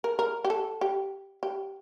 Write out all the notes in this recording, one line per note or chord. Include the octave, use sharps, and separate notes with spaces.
A#4
A#4
G4
A4
G4
G4